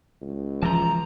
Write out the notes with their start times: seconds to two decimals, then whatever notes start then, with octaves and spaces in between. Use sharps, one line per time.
0.22 C#2
0.63 E3 F3 A5 A#5